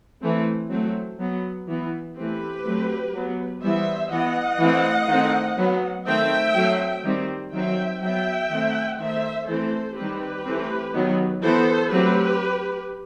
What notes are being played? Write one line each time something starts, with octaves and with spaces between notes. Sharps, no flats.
E3 A3 C4
F#3 A3 C4
F#3 B3
E3 B3
E3 A3 C4 G4 B4
F#3 A3 C4
F#3 B3
E3 G3 B3 C5 E5
E3 B3 D#5 F#5
E3 A3 C4
D#3 A3 C4
F#3 B3
D#3 A3 C4 E5 G5
F#3 A3 C4
D#3 G3 C4
D#3 F#3 C4 E5 G5
F#3 B3 E5 G5
D#3 A3 C4
D#3 A3 C4 C5 E5
E3 A3 C4 A4 C5
D#3 G3 C4 G4 B4
E3 A3 C4
D#3 F#3 B3
E3 B3 A4 C5
F#3 A3 C4 G4 B4